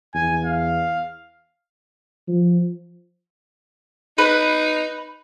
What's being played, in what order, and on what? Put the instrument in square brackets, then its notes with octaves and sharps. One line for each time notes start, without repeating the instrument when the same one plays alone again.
[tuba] E2 [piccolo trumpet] G#5
[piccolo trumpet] F5
[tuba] F3
[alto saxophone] D#4 [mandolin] B4